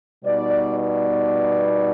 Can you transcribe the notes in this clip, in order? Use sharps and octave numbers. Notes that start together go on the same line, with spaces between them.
B2 G3 B3 D#4 D5
D5